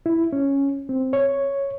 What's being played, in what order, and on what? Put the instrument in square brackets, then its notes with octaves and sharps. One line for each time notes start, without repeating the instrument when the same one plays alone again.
[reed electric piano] E4
C#4
C4
C#5